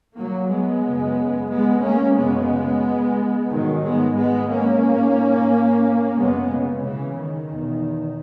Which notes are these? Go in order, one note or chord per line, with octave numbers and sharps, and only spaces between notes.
F#3 A#3
G#3 B3
F#2 C#3
G#3 B3
A#3 C#4
F#2 C#3 G#3 B3
G#2 D#3 F#3
G#3 B3
G#3 B3
A#3 C#4
G#2
F#2 C#3 G#3 B3
C#3
C#3 E3
D#3
E2 B2